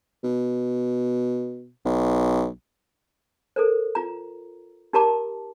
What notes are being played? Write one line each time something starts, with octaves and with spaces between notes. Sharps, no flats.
B2
B1
A4 A#4 C5
F4 A#5
D#4 G4 A#4 A5 A#5 D6